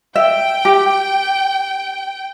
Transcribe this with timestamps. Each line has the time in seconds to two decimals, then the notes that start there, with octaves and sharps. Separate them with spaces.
0.16 E5 G5
0.65 G4